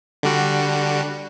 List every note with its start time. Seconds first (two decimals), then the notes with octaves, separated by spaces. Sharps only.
0.23 D3 G3 F#4